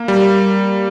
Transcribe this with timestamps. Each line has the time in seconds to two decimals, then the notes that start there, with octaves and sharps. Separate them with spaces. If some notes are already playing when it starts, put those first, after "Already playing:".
Already playing: A#3
0.08 G3